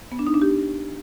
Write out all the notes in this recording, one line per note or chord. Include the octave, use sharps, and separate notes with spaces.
B3
D4
D#4
D4
G4